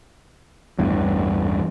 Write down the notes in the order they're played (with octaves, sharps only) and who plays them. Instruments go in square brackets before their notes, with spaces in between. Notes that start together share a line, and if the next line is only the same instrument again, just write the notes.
[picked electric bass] A1 E2 G2